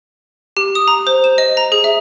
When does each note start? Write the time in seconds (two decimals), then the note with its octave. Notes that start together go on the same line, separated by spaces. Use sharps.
0.57 G4
0.75 D#6
0.88 A#5
1.07 C5
1.24 E7
1.38 D#5
1.57 A#5
1.72 G#4
1.84 E5